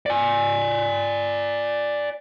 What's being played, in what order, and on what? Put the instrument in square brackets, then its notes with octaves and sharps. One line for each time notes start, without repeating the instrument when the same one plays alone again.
[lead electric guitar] D5 G#5